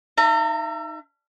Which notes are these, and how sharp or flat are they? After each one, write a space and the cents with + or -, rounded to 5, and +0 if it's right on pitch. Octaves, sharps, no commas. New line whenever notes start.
D#4 +0 E5 +35 A#5 -40